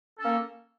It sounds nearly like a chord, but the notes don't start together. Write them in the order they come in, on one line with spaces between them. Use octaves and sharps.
A4 C#4 A#3